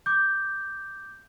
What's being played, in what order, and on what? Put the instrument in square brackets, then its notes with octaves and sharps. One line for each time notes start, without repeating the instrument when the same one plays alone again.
[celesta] D6 G6